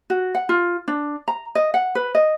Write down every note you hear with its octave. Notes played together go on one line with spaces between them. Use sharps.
F#4
F#5
F4
D4
A#5
D#5
F#5
B4
D#5